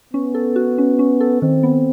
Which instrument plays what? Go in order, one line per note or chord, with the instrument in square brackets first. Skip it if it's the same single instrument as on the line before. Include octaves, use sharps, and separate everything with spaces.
[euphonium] B3 [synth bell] C#4
[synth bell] A4
F#4
C#4
C#4
A4
[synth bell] D#3 [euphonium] C4
[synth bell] B3